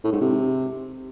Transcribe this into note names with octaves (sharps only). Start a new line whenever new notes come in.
A2
G#2
C3